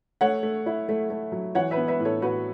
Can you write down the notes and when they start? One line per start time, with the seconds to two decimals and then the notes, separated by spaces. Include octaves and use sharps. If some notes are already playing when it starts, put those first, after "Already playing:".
0.21 A3 C#5 F#5
0.43 A3
0.66 E4
0.89 A3
1.10 A3
1.32 F#3
1.55 E3 C#5 F#5
1.71 B4 E5
1.77 B3
1.88 B4 E5
2.00 A2
2.05 A4 C#5
2.22 A2 F#4 B4